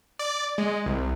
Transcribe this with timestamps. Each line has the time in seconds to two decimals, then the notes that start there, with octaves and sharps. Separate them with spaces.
0.19 D5
0.58 G#3
0.86 C2